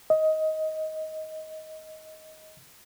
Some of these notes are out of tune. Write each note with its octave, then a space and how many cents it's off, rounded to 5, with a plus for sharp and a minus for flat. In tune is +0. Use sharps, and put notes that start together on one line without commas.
D#5 +15